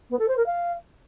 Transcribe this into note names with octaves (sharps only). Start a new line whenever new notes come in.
B3
A4
C5
A#4
F5